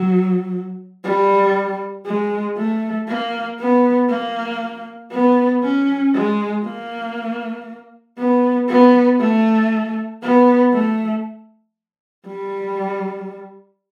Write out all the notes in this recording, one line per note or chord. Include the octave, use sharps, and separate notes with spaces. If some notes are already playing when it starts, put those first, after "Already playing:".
Already playing: F#3
G3
G#3
A3
A#3
B3
A#3
B3
C#4
G#3
A#3
B3
B3
A3
B3
A3
G3